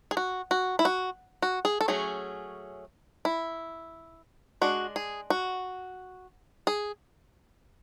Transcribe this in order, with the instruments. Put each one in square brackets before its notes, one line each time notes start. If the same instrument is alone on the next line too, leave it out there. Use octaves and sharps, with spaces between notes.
[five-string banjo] G#4
F#4
F#4
E4
F#4
F#4
G#4
A4
F#3 A3 C#4 G#4
E4
G#3 D4 F#4
G#4
F#4
G#4